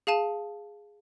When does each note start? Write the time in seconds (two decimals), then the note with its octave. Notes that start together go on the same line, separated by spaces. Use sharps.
0.07 G#4 F5 A5 D#7